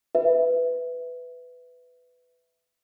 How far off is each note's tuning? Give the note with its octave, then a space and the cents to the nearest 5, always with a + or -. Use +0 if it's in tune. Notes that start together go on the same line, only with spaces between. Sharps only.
B4 +10 E5 +0